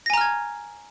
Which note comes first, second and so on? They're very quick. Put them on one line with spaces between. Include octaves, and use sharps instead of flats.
A#6 G#5 A#5 F6 G#6